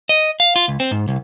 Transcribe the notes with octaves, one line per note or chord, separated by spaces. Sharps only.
D#5
F5
F4
C#2
C4
G#2
C2